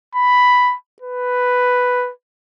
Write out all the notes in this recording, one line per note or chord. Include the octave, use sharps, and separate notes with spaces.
B5
B4